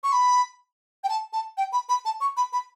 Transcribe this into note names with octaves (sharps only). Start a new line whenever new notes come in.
C#6
B5
G5
A5
A5
G5
B5
B5
A5
C#6
B5
B5